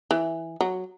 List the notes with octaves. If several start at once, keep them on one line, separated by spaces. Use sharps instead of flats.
E3
F#3